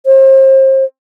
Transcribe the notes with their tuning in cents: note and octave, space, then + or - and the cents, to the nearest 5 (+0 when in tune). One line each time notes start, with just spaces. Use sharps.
C5 +35